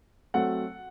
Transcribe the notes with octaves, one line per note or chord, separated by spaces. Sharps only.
F#3 A3 C4 F#5